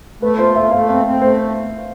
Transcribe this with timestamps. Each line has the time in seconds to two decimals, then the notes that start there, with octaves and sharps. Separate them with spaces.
0.22 A3 B4
0.38 F4 C5
0.55 A3 E5
0.71 A3 F5
0.88 C4 F5
1.05 C4
1.21 A3 C5